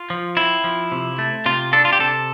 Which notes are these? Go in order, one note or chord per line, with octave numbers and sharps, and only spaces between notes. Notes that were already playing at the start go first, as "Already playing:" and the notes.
Already playing: F4
F3
C4 E4
F3
C3
A3
C3 F4
D4 A4
F4
G4
C3 A4